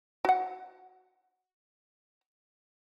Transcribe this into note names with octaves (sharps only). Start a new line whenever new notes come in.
F#4 F#5